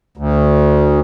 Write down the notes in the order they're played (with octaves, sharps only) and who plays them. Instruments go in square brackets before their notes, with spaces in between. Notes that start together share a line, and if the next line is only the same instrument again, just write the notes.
[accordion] D2